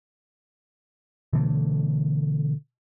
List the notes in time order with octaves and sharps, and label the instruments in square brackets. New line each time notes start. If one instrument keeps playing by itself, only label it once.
[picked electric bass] B2 D3 E3 A3